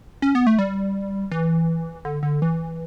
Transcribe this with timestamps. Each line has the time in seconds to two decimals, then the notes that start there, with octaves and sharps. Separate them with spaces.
0.22 C#4
0.35 B3
0.47 A3
0.59 G3
1.32 E3
2.05 D3
2.23 D3
2.42 E3